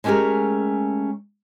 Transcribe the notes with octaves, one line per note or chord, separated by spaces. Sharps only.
G#3 A3 C#4 G4 G#4 A#4